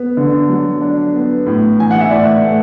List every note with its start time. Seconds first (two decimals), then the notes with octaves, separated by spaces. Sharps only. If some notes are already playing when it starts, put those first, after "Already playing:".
Already playing: B3
0.17 D3
0.49 F#3
0.81 D4
1.14 B3
1.46 A2
1.79 E3 G#5
1.91 F#5
2.01 E5
2.11 A2 D5
2.44 A3